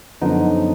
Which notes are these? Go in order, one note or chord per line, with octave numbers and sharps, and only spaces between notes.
F#2 D3 F3 B3 D#4